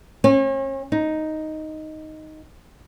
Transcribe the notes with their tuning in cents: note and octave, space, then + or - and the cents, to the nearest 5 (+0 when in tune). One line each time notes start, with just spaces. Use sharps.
C#4 -40
D#4 +0